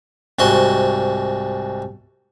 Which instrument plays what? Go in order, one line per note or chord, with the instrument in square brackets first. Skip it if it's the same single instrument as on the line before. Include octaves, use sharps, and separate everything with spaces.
[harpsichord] C2 G#2 F#4 C6